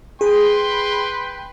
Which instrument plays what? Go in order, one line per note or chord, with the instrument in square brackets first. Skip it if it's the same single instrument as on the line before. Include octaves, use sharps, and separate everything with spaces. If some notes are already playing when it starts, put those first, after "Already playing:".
[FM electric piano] G#4 [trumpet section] B4 G5 C6